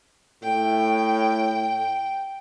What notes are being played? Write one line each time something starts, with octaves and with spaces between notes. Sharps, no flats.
A2 G5